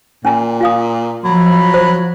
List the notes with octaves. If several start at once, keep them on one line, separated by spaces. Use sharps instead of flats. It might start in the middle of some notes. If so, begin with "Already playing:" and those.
A#2 C#4 G#5 A#5
F4 F5 D#6
F3 F#3 B5
C5